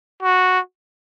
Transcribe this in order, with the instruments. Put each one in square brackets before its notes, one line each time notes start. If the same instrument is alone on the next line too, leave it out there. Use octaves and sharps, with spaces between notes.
[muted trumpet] F#4